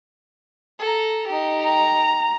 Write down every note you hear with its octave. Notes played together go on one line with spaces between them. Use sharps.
A4 A#5
D#4 G4
A#5